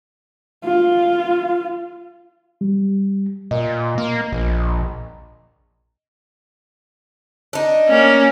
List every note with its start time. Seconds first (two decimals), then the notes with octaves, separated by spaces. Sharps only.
0.65 F4
2.61 G3
3.51 A#2 D#5
3.98 A#3
4.32 A#1
7.53 D4 D#4
7.88 A#3 C#4